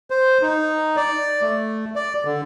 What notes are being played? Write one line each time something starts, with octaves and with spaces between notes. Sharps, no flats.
C5
D#4
D5
A3
D5
D3